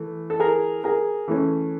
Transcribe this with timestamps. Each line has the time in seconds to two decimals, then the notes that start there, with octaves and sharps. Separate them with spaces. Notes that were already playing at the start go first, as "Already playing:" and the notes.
Already playing: E3 A3
0.30 A4
0.40 G#4 A#4
0.84 G#4 A#4
1.28 E3 A3 C#4